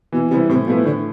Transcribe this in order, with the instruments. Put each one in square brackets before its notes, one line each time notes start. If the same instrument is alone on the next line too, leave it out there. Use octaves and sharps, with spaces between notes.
[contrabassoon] B2 [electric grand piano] E3
[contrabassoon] C3 [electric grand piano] G3 B3 E4
[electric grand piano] A2 [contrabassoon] C3
[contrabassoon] B2 [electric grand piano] F3 A3 E4 B4
[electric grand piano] A2 [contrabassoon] D3